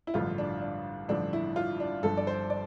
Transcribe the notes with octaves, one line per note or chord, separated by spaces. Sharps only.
E4
A1 G2 D3 F3 F4
D4
D4
A1 G2 D3 F3 D4
E4
F4
D4
G1 G2 F3 A4
D5
C5
D5